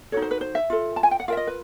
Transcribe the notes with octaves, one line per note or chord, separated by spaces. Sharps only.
D#4 F#4 A4 C#5
C5
B4
C5
E5
F4 A4
A5
G#5
G5
F#5
F4 A#4 E5 F5
D#5
B4